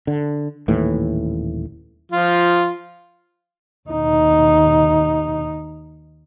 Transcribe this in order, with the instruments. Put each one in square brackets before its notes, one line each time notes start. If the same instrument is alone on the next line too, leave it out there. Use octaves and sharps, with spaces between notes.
[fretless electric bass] D3
D#1 D#2 A2 E3
[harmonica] F3 F4
[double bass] D#2 D#4